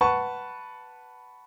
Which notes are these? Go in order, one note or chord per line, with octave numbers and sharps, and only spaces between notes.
B4 F#5 A5 C#6